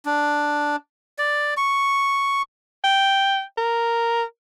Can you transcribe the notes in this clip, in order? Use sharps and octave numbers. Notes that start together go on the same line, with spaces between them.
D4
D5
C#6
G5
A#4